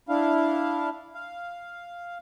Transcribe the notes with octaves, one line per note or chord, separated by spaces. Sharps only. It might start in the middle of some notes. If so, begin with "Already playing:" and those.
D4 E4 F5
F5